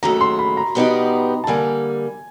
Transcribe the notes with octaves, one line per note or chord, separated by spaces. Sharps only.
D#2 C#3 F#3 A3 A#5
C6
B5
A#5
B2 G3 B3 D#4 G4
A5
D3 G3 A#3 G#5